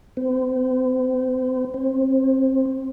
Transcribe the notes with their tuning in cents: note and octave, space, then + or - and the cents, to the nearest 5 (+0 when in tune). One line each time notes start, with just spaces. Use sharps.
C4 -35
C4 +25